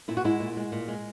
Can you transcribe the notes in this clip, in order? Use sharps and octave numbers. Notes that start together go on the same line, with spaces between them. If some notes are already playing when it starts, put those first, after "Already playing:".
A#2 E4
F#4
G#3 E4
A#2
G#3
A#2
G#3